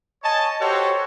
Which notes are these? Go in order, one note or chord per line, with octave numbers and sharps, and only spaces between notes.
C#5 D#5 G#5 A5
F#4 G4 A4 C5 C#5